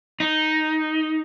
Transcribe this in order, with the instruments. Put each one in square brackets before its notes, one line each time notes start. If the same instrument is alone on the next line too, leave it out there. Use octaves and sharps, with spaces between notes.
[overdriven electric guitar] D#4